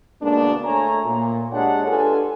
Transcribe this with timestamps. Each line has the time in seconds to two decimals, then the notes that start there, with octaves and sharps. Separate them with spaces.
0.22 D2 B2 G#3 A#3 D4
0.64 A3 C#5 G#5 A#5
1.06 A#2
1.52 G#3 D4 G4 C#5 F#5
1.87 D4 F4 G4 A4 B4 G#5